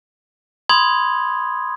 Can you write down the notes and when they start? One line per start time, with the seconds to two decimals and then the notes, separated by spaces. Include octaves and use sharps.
0.69 B5 C6 D#6 G#6